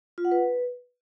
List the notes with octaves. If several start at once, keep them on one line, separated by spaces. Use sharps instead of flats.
F4
F#5
B4